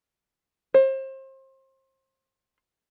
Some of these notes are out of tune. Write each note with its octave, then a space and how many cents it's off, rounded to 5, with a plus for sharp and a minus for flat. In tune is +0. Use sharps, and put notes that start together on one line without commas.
C5 +30